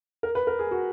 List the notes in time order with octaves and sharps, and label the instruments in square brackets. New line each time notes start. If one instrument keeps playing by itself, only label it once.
[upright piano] A#4
B4
A#4
G#4
F#4